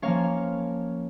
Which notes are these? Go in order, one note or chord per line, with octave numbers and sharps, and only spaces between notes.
F3 A#3 C#4 C#5 F5